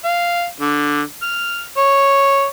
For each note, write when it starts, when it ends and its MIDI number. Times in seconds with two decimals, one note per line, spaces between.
0.04 0.44 77
0.61 1.01 50
1.22 1.64 89
1.77 2.45 73